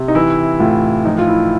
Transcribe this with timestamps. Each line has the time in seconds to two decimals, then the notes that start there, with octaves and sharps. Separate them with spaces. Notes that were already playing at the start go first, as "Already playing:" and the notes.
Already playing: C3
0.08 D#4
0.15 E3 E4
0.59 A2 F4
1.05 F3 D#4
1.18 F4
1.28 E4